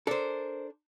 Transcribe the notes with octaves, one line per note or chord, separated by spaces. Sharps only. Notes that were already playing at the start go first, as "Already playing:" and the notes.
D4 A4 A#4 C5